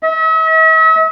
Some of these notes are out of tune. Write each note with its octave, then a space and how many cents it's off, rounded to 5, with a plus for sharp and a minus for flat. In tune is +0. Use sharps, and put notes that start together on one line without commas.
E5 -45